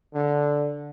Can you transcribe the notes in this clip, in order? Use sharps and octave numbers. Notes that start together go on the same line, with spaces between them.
D3